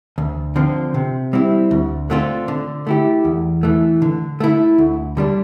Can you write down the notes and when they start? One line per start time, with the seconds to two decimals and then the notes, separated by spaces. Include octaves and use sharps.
0.18 D2
0.56 D3 F3 C4
0.94 C3
1.33 G3 C4 E4
1.71 D2
2.10 D3 A3 C4 F4
2.48 D3
2.87 A3 E4 G4
3.25 E2
3.63 E3 A3
4.02 D3
4.40 A3 E4
4.78 D2
5.17 D3 G3 D4